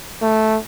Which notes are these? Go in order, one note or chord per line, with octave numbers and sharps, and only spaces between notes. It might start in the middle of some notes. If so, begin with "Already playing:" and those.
A3